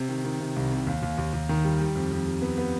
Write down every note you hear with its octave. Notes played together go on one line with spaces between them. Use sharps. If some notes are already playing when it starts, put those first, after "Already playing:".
Already playing: C3
D#3
D#3
C3
C2
C3
D#2
D#2
D#2
D#2
D#3
G3
G3
F2
F2
G3
B3
B3